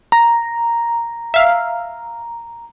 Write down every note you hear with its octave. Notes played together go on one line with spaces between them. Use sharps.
A#5
E5 F5